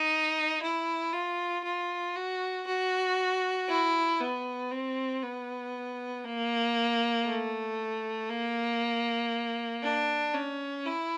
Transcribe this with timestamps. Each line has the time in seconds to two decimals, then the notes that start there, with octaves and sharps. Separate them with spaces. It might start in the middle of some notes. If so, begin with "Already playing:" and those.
Already playing: D#4
0.62 E4
1.13 F4
1.64 F4
2.16 F#4
2.67 F#4
3.69 E4
4.20 B3
4.71 C4
5.22 B3
6.24 A#3
7.26 A3
8.30 A#3
9.83 D4
10.34 C#4
10.85 E4